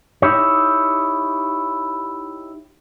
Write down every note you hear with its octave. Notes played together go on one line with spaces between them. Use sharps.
D#4 E4 G4 C#5